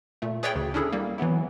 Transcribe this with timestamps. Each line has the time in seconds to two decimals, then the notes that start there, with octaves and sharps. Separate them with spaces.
0.22 A#2 A3
0.43 G#4 B4 C#5 D5 E5 G5
0.55 D2 C#3
0.74 C#4 D4 E4 G#4 A4
0.93 G3 A#3
1.18 E3 F#3 B3 E4